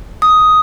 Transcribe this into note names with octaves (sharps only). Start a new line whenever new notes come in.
D#6